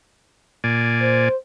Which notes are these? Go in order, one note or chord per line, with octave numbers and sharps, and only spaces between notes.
A#2 D5 G#5
C5